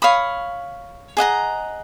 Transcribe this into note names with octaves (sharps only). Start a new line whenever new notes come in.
C#5 F5 B5 D#6
G#4 D#5 F#5 A#5